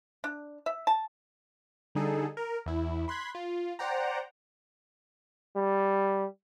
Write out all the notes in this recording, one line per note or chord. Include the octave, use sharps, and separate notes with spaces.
D4
E5
A5
D3 G3 D#4 G#4 A4
A#4
E2 E4
B5 C6 F#6 G#6 B6
F4
C5 D5 F#5 G5 A#5
G3